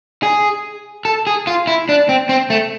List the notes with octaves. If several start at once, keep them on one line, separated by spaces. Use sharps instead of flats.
G#4
A4
G#4
F4
E4
D4
C4
C4
A3